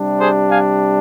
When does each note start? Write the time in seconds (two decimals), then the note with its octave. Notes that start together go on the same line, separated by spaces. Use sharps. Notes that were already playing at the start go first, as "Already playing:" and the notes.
Already playing: C3 G3 D4
0.19 G#4 C5
0.49 F5 G#5